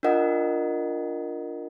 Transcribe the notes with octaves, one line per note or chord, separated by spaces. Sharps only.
D4 F4 A#4 D#5 F#5